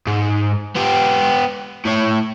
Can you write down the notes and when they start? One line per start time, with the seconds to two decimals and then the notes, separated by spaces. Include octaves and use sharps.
0.07 G#2
0.75 B3 G4
1.85 A2 C#5